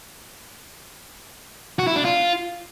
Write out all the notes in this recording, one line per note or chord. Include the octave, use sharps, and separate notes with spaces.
F#4
E4
D4
F4